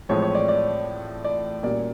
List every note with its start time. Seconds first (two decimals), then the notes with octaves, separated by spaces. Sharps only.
0.09 A1 A2 F3 G#3 C4 C#5
0.22 C#5
0.35 D5
0.48 D5
1.24 D5
1.63 A#2 G3 A#3 C#4 F#4 D5